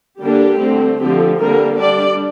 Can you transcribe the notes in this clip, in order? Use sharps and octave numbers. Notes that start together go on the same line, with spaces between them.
D3 G3 A#3 D4 G4
D3 A3 C4
D3 F3 A3 C4 G4
D3 G3 A#3 A#4
G3 D4 D5